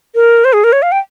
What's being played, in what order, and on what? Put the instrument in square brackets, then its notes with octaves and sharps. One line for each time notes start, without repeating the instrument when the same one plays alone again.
[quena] A#4
C5
G#4
A#4
C#5
F5
G5